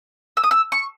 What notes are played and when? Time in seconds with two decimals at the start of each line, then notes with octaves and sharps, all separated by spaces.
0.37 E6
0.44 D#6
0.51 E6
0.72 C#6